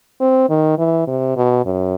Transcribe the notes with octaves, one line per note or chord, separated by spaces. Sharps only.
C4
D#3
E3
C3
B2
F#2